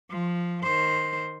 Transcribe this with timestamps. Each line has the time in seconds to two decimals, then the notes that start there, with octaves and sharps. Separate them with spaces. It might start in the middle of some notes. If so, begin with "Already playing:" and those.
0.10 F3
0.63 D#3 C5